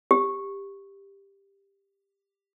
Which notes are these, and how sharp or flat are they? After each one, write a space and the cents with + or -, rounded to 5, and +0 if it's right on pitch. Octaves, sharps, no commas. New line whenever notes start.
G4 +10